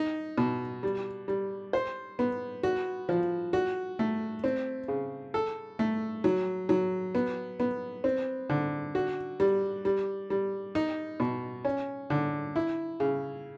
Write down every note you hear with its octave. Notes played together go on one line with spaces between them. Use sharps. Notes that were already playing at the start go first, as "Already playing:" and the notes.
Already playing: D#4
B2
G3
G3
C5
B3
F#4
F3
F#4
A3
C4
C#3
A4
A3
F#3
F#3
B3
B3
C4
D3
F#4
G3
G3
G3
D#4
B2
C#4
D3
E4
C#3